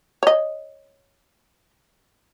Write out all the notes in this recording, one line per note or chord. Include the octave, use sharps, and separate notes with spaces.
C#5 D#5